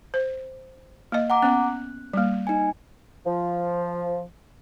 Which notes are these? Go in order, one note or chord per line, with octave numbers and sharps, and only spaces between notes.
C5
A#3 D#5
F#5 A#5 D6
B3 C#4 F#6
G3 A#3
D#4 G#5
F3